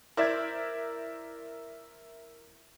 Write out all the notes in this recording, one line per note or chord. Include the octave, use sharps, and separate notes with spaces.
E4 A#4 C5 D5 E5 G#6